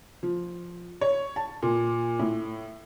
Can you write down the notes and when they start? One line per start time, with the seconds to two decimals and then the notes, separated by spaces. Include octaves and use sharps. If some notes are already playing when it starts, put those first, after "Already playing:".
0.23 F3
1.01 C#5
1.36 A5
1.63 A#2
2.19 A2